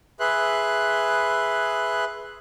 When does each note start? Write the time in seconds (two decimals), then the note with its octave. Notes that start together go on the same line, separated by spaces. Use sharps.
0.20 G#4 B4 E5 C6 F#6